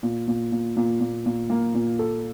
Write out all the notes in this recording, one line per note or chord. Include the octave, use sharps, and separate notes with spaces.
A#2
A#2
A#2
A#2
A#2
A#2
A#3
A#2
A4